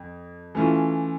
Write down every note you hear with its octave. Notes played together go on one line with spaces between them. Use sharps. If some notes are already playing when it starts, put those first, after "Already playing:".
Already playing: F2
E3 A3 C#4 F4